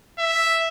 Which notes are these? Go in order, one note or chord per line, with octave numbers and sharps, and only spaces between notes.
E5